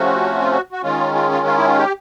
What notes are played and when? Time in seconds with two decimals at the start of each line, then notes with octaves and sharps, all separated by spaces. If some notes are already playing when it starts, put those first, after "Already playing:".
Already playing: C3 F3 A3 C#4 F#4
0.42 F4
0.52 F#4
0.72 F#4
0.83 D#3 G#3 C#4 F4
1.15 F4
1.31 F4
1.47 F4
1.57 E4
1.68 F4
1.78 G4